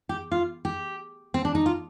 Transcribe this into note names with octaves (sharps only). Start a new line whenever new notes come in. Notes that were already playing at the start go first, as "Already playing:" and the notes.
G4
F4
G4
C4
D4
D#4
F4